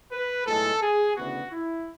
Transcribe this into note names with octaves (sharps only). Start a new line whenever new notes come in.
B4
B1 A2 G#3 A4
G#4
D2 C#3 E3 B3 F#4
E4